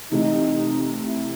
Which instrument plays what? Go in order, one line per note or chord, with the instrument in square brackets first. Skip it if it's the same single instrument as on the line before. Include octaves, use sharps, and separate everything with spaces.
[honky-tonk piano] C3 E3 A3 [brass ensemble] D#4
[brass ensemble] E4